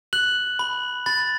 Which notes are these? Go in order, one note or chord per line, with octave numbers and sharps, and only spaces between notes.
F#6 F#7
B5
B5 A6